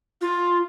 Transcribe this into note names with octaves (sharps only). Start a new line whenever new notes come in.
F4